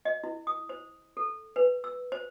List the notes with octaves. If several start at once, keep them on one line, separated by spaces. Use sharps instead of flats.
D#5
E4
D#6
C5
A4
B4
E6
C5